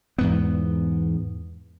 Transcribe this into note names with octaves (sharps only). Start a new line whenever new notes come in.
E2 G#2 B3